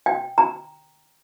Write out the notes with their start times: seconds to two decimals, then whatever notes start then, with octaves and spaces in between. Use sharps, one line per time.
0.06 G5
0.38 A#5